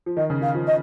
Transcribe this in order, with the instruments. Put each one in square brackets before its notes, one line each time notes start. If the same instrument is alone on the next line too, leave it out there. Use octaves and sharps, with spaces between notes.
[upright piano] F3
[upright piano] D#3 [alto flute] D#5
[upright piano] C#3
[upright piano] D#3 [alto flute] F5
[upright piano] F3
[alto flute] D#5